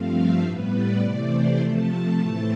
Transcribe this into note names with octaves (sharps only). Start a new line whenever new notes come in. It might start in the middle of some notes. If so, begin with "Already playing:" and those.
Already playing: G2 F3 A3 C4 F5
E5
A2 G3 B3 B4
D5
C3 E3 A3 C4
C5
C3 F3 A3 A5
A2 E3 A3 C4